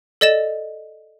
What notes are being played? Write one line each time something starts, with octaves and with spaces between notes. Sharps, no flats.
A4 D5 D#5 A6 E7